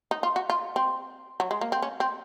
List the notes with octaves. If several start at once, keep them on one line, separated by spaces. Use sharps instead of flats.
D#4
F4
F#4
F4
C4
F#3
G#3
A#3
C4
C#4
C4